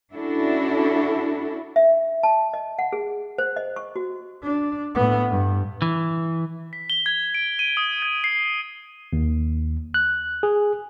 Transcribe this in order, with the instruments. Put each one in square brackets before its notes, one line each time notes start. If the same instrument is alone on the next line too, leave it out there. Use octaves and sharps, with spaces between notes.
[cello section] C#4 D4 E4 F#4 A4
[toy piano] E5
A5
D#5
F#5
G#4
C5
D#5
C#6
F#4
[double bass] D4
A2 B3
G2
[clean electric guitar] E3
[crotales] B6
G7
G#6
D7
D#7
D#6
G#6
C7
[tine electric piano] D#2
F#6
G#4